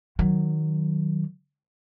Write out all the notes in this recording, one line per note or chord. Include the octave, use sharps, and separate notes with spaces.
D#3 F#3